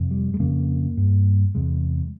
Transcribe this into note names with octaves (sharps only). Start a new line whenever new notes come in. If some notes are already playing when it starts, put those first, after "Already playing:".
Already playing: F2 C3
G3
G#3
F2 C#3 A#3
G2
E2 C3 G#3